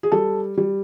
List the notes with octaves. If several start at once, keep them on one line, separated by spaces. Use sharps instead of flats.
G#4
G3 A4
G3